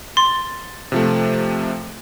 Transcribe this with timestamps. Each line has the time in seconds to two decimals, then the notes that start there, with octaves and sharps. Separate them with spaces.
0.17 C6 A6
0.92 C3 F3 A3